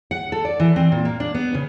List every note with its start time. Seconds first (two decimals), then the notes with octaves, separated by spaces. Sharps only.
0.11 F#5
0.32 A4
0.45 D5
0.60 E3
0.76 C4
0.92 A#2
1.05 A#3
1.20 D4
1.35 B3
1.54 C#3